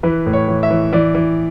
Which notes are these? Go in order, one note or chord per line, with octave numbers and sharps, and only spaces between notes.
E3 B4
A2
C#5
E3
E5
E3
E3 D5
E3